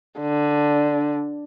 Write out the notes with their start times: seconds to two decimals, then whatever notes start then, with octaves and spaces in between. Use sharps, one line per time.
0.20 D3